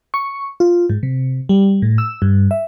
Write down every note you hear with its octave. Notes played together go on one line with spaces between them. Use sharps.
C#6
F4
G#2
C3
G3
A2
E6
G2
E5